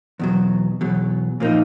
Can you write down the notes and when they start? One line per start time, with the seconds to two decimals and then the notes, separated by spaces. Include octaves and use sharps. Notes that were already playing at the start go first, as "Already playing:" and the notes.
0.19 E2 B2 F#3
0.81 E2 B2 F#3
1.40 A#2 F3 A#3 D#4